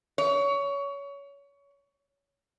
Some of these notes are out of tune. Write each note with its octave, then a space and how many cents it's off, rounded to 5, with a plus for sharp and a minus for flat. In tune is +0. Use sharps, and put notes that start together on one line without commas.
C#5 +20